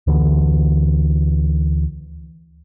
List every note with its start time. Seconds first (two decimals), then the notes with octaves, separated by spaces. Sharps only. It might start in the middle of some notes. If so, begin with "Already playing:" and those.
0.07 D2 D3 E3